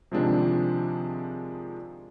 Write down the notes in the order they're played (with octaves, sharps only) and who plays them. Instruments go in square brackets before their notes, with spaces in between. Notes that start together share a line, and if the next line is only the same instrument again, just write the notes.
[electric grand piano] C3 D#3 F3 G#3 C4 D4